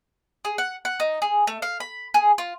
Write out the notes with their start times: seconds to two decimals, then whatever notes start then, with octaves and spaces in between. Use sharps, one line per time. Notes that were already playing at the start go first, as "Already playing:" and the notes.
0.45 G#4
0.58 F#5
0.85 F#5
1.00 D#4
1.22 G#4
1.47 A3
1.62 F5
1.80 B5
2.14 G#4
2.38 F4